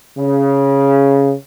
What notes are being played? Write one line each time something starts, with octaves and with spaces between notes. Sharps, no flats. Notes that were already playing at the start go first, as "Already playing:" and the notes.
C#3